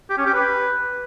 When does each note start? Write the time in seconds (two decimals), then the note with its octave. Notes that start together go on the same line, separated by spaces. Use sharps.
0.10 G4
0.18 C#4
0.26 G4
0.34 B4